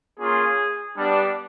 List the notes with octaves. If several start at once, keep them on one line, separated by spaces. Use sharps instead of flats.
A#3 C#4 F4 G#4
G3 B3 D4